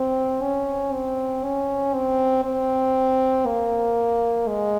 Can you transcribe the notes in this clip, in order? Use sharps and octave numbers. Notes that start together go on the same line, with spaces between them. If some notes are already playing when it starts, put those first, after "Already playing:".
Already playing: C4
C#4
C4
C#4
C4
C4
A#3
G#3